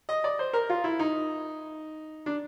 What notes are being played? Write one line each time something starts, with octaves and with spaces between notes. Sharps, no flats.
D#5
D5
C5
A#4
F4
E4
D#4
D4